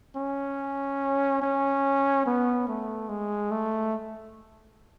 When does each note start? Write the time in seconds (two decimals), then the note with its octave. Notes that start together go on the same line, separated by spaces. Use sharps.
0.16 C#4
1.42 C#4
2.26 B3
2.68 A3
3.09 G#3
3.51 A3